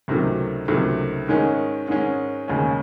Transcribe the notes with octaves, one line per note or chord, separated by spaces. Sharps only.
C#2 C3 D#3 F#3 A3
C#2 C3 D#3 F#3 A3
G#2 D#3 G#3 C#4
G#2 D#3 G#3 C#4
E1 D#2 C#3 G#3 C#4